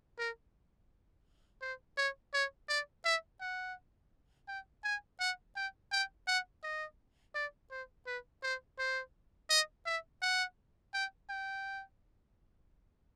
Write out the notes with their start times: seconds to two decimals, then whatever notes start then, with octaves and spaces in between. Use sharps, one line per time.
0.19 A#4
1.62 C5
1.97 C#5
2.34 C#5
2.69 D5
3.05 E5
3.41 F#5
4.48 G5
4.84 G#5
5.20 F#5
5.56 G5
5.92 G5
6.28 F#5
6.63 D#5
7.35 D5
7.71 C5
8.07 B4
8.43 C5
8.79 C5
9.50 D#5
9.86 E5
10.22 F#5
10.94 G5
11.29 G5